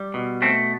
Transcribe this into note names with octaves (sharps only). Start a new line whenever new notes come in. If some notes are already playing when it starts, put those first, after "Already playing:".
Already playing: G3
B2
A3 C4